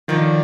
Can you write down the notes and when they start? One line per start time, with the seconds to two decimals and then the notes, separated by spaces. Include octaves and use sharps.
0.08 D3 D#3 F3 F#3 A#3